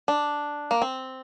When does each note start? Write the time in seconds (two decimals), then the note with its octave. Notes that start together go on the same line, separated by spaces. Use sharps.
0.08 D4
0.71 A#3
0.82 C4